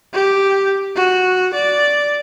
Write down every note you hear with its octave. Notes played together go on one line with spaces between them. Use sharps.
G4
F#4
D5